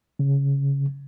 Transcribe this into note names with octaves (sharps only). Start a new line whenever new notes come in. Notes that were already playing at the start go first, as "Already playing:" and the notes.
C#3